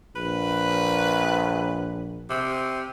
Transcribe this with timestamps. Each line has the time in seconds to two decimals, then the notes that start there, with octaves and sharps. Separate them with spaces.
0.16 A#1 B4
2.30 C3